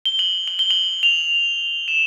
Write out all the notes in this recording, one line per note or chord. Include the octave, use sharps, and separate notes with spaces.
G7
F#7
F#7
G7
F#7
F7
E7